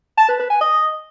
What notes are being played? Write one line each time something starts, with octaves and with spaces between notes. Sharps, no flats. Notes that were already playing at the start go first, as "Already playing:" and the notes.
A5
B4
B4
G#5
D#5